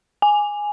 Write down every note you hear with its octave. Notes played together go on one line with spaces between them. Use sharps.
G#5